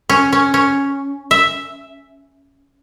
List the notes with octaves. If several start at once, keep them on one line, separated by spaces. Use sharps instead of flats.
C#4
C#4
C#4
E5